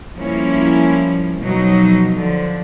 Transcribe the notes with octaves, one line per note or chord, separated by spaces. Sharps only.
F3 G3 A#3 C#4 E4
B2 F3 F#3 D#4
D3 F3